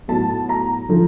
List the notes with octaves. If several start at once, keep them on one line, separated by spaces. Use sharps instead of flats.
A2 F#3 B3 A5
A#5
D3 F3 A3